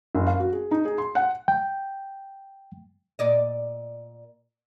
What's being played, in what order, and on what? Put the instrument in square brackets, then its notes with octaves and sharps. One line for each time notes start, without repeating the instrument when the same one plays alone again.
[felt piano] F#1
F5
F#4
G#4
D#4
G#4
C6
F#5
[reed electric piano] G5
[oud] A#2 D5 D#5